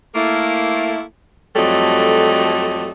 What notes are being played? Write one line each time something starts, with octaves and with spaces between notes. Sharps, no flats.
A3 A#3 E4
F2 F#3 G3 A3 A4 D#5